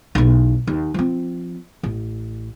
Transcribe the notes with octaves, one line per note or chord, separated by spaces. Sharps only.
B1 E2
D#2
F3 C4
A1